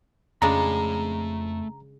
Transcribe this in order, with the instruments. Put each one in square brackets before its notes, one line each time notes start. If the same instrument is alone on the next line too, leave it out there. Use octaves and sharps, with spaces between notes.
[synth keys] F2 [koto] C#3 G#3 D4 [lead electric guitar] A3 B5 [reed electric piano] A#5